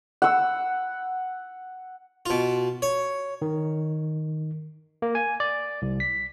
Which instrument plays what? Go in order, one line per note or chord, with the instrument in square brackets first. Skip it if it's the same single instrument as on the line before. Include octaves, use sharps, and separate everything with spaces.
[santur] F#5 E6
[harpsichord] B2 F4
C#5
[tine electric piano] D#3
A#3
G#5
D5
C2
B6